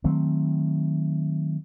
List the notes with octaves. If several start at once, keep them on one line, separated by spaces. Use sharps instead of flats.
D#3 F#3 A3 C4